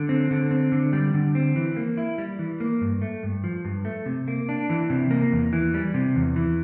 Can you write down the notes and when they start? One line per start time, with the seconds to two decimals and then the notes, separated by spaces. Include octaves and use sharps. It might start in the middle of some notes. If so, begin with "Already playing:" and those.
Already playing: D3
0.09 C4
0.31 D3
0.51 C4
0.72 D3
0.93 G3
1.14 D3
1.35 C4
1.56 E3
1.76 A#3
1.97 E4
2.18 G3
2.39 E3
2.60 A#3
2.81 G2
3.02 A3
3.23 G2
3.44 F3
3.65 G2
3.85 A3
4.06 C3
4.28 A#3
4.49 D4
4.70 E3
4.90 C3
5.10 A#3
5.32 E2
5.53 E3
5.74 G3
5.94 C3
6.16 E2
6.36 E3